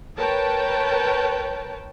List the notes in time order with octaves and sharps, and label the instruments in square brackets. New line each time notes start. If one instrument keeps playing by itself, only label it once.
[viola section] A#4 B4 C#5 G5 A5